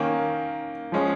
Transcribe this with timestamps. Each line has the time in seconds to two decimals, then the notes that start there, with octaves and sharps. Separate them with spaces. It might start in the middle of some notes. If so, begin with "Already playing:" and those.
Already playing: D#3 A#3 C#4
0.92 F3 G#3 C#4